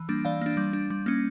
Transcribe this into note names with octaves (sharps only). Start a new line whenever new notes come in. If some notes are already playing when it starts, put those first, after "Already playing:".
Already playing: E3
G3 A#3 D4
E3 D5 F5
A#3 D4
G3
D4
G3
A#3 C#4